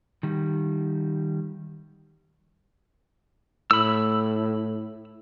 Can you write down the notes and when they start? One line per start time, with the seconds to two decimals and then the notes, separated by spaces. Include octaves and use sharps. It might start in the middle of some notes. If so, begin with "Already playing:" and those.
0.23 D#3 G3
3.71 A2 B5 E6